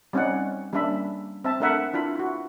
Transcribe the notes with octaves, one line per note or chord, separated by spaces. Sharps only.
G3 C4 C#4 D#4 D5 F#5
G3 A#3 C#4 D4 E5 B5
C4 E5 A5
A3 D4 A#4 E5 F#5 B5
D4 E4 F4 B5
E4 F#4